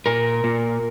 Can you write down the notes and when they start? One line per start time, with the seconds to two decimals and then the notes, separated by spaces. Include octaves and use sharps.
0.06 A#2 A#4
0.44 A#2